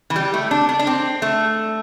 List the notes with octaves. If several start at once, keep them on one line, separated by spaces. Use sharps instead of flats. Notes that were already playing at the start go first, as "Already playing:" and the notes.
E3
G3
A3
D4
D4
D4
C4
A3